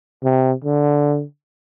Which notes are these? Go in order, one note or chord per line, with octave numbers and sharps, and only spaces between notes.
C3
D3